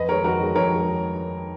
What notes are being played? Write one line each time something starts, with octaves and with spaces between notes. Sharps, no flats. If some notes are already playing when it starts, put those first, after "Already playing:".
Already playing: F2 B4 D#5
D#3 G#3 A#4 C#5
F2 F#4 A#4
D#3 G#3
F2 A#4 C#5
D#3 G#3